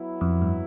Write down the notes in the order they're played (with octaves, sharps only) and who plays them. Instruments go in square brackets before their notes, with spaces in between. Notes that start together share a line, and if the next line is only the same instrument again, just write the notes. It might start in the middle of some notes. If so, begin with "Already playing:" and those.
Already playing: [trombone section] F#3 B3 E4
[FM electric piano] F2
G2